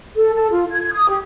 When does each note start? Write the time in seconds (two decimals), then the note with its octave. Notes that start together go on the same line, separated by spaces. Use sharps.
0.17 A4
0.35 A4
0.51 F4
0.71 G#6
0.92 D#6
1.09 G4